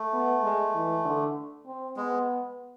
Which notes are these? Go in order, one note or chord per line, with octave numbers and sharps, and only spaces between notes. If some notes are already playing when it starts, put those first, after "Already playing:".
Already playing: A3
B3
G#3
E3
D3
C4
G#3 B3